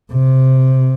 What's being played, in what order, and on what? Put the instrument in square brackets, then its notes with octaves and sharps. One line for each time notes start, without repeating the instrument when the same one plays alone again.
[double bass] C3